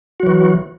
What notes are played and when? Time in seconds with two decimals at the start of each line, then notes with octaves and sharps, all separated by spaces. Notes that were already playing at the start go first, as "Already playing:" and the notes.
0.20 F#4
0.23 F#3
0.27 E3